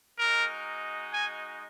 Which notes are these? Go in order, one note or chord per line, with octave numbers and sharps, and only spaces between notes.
G#3 D#4 F#4 A#4
G#5